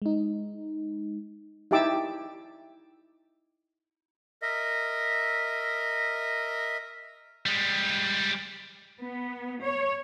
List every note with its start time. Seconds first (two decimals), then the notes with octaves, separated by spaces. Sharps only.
0.02 G#3 D#4
1.71 D#4 E4 G4 A5 D6 E6
4.42 A#4 D#5 E5
7.46 G3 G#3
9.00 B3
9.63 C#5